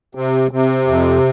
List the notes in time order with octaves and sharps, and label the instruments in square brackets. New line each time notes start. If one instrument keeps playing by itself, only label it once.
[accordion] C3
C3
F2